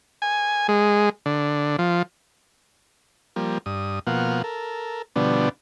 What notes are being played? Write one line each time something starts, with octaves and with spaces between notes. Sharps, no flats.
G#5
G#3
D3
F3
F3 G3 A#3
G2 D#6
B2 F3 A#3 F5 F#5
A4 A#4
B2 D3 F3 G3 B3 D4